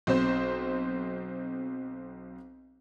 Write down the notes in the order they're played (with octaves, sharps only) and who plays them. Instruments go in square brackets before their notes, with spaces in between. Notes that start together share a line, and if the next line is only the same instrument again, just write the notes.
[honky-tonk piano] B1 C4 C5 C6